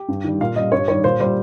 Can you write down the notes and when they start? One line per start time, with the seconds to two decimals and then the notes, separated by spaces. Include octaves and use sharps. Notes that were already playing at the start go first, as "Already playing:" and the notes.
Already playing: G4
0.09 G2
0.24 D#3 G3
0.41 A#2 F5
0.56 G3 D#5
0.72 G2 C#5
0.88 D#3 G3 C#5
1.04 A#2 C5
1.20 G3 C5